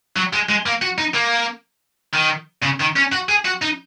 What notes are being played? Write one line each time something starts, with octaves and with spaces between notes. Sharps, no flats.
F#3
G#3
G#3
A#3
F#4
D#4
A#3
D#3
C#3
D#3
C#4
F#4
G#4
F#4
D#4